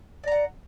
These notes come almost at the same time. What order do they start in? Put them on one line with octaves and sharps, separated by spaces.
D5 A#5 F#5